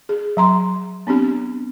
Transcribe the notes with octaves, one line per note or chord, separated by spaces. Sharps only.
G#4
F#3 A#5 C6
B3 C4 D4 G4